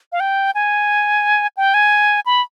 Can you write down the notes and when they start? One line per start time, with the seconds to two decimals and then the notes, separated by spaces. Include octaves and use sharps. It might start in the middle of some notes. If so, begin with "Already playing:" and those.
0.12 F5
0.20 G5
0.55 G#5
1.57 G5
1.74 G#5
2.26 B5